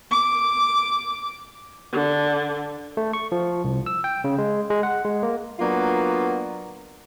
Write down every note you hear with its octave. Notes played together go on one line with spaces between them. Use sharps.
D6
D3
A3
C#6
F3
C2
E6
G5
C#3
G#3
G#3
F#5
G#3
A#3
F#3 A#3 B3 D4 F4